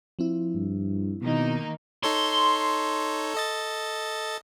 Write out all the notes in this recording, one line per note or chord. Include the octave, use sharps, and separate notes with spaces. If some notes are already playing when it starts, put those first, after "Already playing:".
F3 C4 E4
G2
B2 D#3 A#3 D#4
D#4 A4 C#5 C6
A4 D#5 A6